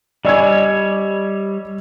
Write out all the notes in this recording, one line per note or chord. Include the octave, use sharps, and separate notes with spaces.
G3 D4 C#5 D#5 G#5 E6 G#6